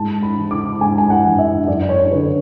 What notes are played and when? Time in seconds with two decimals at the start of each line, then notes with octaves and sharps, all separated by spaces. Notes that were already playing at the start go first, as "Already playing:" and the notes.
Already playing: G#2 A5
0.23 B5
0.37 E3
0.51 D6
0.81 G#2 G#5
0.98 G#5
1.10 F#5
1.24 E3
1.39 E5
1.67 F#2 D5
1.89 C#5
2.11 D3 B4